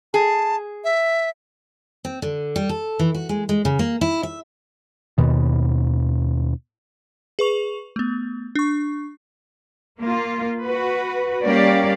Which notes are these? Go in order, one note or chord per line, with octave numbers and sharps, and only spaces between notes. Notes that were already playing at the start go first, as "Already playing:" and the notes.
G#4 A5
E5
C4
D3
G3
A4
E3
F#4
G#3
G#3
C#3
A#3
E4
E5
D#2 B2 D#3
G#4 B4 C#6 F7
A3 B3
D4 C#6
A#3 F4
F#4 B4
G3 A#3 C#4 G4 D5 F5